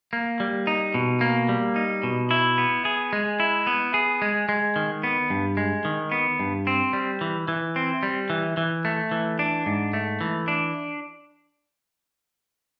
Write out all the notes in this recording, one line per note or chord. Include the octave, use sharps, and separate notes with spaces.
A#3
G3
D#4
B2
A#3
G3
D#4
B2
E4
B3
G#4
G#3
E4
B3
G#4
G#3
G#3
D#3
B3
G2
G#3
D#3
B3
G2
C4
G3
E3
E3
C4
G3
E3
E3
A3
E3
D4
G#2
A3
E3
D4